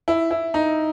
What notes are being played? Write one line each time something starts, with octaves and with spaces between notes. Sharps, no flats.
E4
E4
D#4